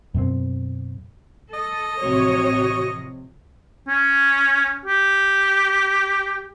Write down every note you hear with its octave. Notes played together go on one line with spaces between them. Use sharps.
F#2 B2 C4
A4 D#5
A1 C3 F3 F#4 C#5
C#4
G4